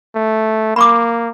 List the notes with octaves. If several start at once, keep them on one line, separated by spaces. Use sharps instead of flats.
A3
A#3 B5 C#6 D6